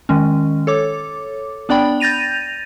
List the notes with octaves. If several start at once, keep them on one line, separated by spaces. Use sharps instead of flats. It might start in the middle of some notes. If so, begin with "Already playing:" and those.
D#3 G#3 C#4
A4 C#5 D6
B3 D4 D5 G5 B5
G6 A6 A#6 D#7 F7